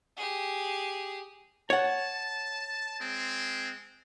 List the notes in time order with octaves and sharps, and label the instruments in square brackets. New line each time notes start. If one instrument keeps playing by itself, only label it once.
[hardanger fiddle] G4 G#4
[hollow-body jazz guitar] C#5 F#5 [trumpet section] A5
[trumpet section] G#3 C4